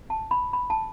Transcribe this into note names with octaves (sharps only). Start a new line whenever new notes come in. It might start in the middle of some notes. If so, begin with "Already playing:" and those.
A5
B5
B5
A5